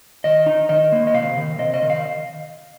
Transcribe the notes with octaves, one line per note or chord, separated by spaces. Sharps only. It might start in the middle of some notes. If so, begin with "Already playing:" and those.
D#3 D#5
D#4
D#3 D#5
A#3
D#5
C3 F5
D#3
C3 D#5
D#5
D#3
F5